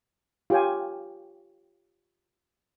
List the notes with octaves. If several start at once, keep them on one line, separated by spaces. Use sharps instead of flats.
F4 G4 C#5 G5 G#5